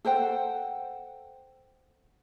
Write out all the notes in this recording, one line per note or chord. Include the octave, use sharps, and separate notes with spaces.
A4 C5 F#5 G5